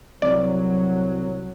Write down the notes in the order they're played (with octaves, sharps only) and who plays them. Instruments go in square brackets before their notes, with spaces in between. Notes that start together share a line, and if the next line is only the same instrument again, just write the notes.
[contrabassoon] C2 [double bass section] F#3 [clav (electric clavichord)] D5